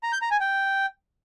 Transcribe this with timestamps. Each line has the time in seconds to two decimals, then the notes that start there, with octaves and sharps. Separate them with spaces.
0.03 A#5
0.12 G6
0.22 A#5
0.31 G#5
0.40 G5